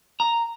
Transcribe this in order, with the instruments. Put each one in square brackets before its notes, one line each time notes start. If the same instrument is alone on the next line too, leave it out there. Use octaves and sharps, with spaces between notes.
[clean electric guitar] A#5